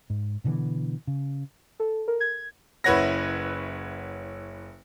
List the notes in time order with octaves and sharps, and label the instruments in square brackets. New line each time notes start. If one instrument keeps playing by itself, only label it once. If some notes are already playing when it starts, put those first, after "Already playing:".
[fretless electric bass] G#2
B2 D3 E3 B3
C#3
[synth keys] A4
A#4
G#6
[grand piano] F#1 E4 B4 C#5 F#5 A#6